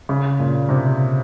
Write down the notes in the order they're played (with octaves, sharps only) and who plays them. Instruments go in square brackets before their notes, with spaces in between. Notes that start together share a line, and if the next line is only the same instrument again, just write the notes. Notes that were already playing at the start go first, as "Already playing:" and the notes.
[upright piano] C#3
A#2
C3